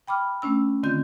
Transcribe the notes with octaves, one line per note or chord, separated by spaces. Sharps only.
G5 B5 D6 F6
A3 C#4 D4 E6
D3 D#3 C4 F4 G6